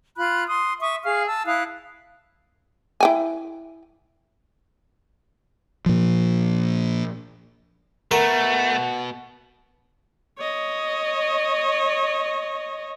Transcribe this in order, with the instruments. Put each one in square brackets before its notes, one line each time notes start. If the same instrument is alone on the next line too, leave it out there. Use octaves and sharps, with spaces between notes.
[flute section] F4 B5 F#6
C6 D#6
E5 C#6 D#6
G#4 F5 F6
A5 E6
E4 F5 D#6 F#6
[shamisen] E4 G5 G#5
[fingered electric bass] A#2 F3
[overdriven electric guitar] B2 [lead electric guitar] A3 [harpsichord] A#4 [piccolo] F#5
[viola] C#5 D#5